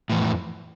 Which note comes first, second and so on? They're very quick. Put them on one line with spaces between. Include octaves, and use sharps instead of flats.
A2 E3 F2